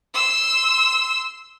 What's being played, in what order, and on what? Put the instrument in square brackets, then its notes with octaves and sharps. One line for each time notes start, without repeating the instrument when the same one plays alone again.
[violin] C6 E6